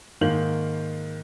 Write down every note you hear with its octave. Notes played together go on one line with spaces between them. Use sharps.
G#2 D#3 A#3 F5 G6 F#7